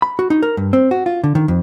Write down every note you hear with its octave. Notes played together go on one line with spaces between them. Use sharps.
B5
F#4
D#4
A#4
G2
C4
F#4
F4
D3
D#3
F2